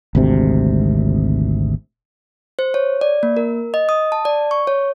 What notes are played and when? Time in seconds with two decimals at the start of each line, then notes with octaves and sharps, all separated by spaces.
0.15 G#1 D2 C3
2.59 C5
2.74 C#5
3.01 D5
3.23 A#3
3.37 A#4
3.74 D#5
3.89 D#6
4.12 A5
4.25 D5
4.51 C#6
4.67 C#5